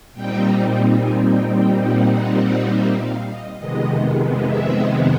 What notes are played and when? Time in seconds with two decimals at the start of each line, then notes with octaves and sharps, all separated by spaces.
0.14 A#2 G3 C4 D#4 G5
1.00 G#5
1.28 G5
1.57 G5
1.86 F#5
2.15 F#5
2.43 F#5
2.72 E5
3.00 F5
3.29 D#5
3.58 F2 C3 D#3 G#3 B3 D#5
4.45 E5